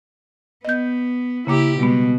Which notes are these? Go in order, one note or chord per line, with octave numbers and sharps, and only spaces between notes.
B3 D#5 G6
C#3 A#3 E4 G4 D6
B2 G3 G#3 B3